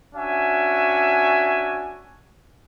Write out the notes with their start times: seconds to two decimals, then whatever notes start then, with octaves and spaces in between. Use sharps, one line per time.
0.16 C#4 D4 F#4 E5 G#5